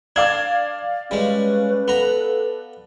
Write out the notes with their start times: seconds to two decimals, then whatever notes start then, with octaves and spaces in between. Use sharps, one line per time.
0.16 D4 D5 F5 G#6
1.11 G3 G#3 C#4 B4
1.88 B3 A4 A#5